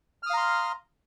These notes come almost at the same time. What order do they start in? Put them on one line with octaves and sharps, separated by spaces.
F6 D#6 F5 A#5 C6